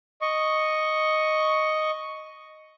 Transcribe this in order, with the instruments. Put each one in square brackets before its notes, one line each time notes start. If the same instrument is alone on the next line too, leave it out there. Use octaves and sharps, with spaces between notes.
[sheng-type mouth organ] D#5 C#6